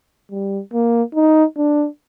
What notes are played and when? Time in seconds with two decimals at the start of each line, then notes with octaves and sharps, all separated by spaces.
0.32 G3
0.73 A#3
1.15 D#4
1.57 D4